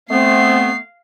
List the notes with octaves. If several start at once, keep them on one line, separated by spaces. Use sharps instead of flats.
A3 B3 C4 F5 C7